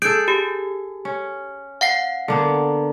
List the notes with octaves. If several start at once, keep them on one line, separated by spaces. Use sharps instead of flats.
G#4 A4 G6 D7
G4
C#4
F5 F#5 C7
D3 A#3 B3